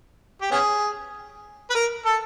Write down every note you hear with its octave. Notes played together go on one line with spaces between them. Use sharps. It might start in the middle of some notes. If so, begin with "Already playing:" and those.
G4
B3 C#4 G#4
B4
A#4
A4